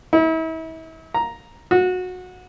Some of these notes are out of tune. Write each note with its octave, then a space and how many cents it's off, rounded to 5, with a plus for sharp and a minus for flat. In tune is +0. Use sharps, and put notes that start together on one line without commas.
E4 -40
A#5 +5
F#4 -20